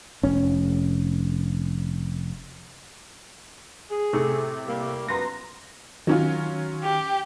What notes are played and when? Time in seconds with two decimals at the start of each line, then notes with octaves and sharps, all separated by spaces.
0.23 F1 C#4
3.90 G#4
4.13 A2 C3 A3
4.67 G3 A#3
5.08 F#2 F3 B3 A#5 C6 A#6
6.07 D#3 F#3 C#4 F4
6.84 G4